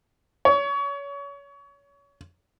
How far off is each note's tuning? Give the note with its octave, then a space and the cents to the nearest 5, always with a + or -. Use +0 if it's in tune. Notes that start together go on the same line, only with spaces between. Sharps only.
C#5 +30